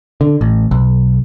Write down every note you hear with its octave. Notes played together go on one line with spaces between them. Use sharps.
D3
A1
B1